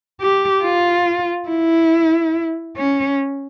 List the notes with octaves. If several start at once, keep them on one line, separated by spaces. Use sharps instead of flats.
G4
F4
E4
C#4